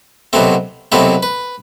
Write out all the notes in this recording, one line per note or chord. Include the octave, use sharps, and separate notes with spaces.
C2 B2 F#3 A3 C4
C2 B2 F#3 A3 C4 B4
B4